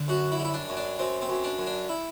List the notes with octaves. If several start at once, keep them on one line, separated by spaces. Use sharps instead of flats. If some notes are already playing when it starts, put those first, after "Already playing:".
Already playing: D3
F#2 F#4
E4
G3
E4
D4
F#2
D4
F#2 C4
C4
F#2
D4
F#2
D4
E4